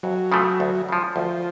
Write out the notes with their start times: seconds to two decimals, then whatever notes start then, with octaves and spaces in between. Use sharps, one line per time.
0.03 F2 F#3
0.32 C#3 F3 A3
0.60 D2
0.89 C#3 F3
1.16 D2 F3